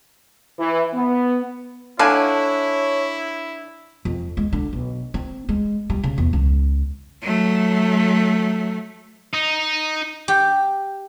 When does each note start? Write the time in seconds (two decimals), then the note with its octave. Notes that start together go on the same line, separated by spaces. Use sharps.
0.59 E3
0.94 B3
1.99 D3 D4 E4 C#5 F5 G#5 F#6
4.05 F2
4.37 G#3
4.53 D3
4.73 B1
5.14 C4
5.49 G#3
5.90 G3
6.04 C#3
6.18 E2
6.33 C#2
7.22 F#3 A3
9.33 D#4
10.28 G4